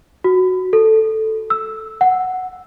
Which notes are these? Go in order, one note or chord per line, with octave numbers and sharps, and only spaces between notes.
F#4
A4
E6
F#5